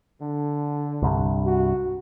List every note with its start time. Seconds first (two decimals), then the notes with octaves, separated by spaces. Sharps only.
0.21 D3
1.02 C2 G2
1.45 F#4